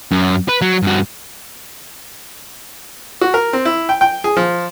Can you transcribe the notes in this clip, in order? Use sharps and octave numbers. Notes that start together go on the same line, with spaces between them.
F#2
B4
F#3
G2 F#4
F#4
A#4
C4
E4
G5
G5
G#4
F3